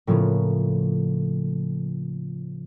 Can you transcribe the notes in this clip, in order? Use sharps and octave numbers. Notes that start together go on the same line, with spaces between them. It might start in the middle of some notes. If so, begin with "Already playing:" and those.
A2 C#3 F3 A#3 B3 C#4